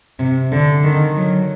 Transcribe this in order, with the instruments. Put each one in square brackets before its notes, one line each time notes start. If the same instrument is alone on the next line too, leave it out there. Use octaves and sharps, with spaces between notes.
[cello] C3
D3
D#3
F#3